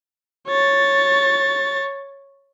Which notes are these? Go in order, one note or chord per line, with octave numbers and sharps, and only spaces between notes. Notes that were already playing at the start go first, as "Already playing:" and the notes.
C#5 A6